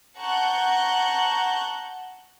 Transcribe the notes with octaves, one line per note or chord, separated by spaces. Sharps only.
F#5 A5 A#5 C#6 F#6 G6